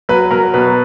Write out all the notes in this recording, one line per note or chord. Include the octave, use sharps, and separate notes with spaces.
F#3 B4
F#3 A#4
B2 B4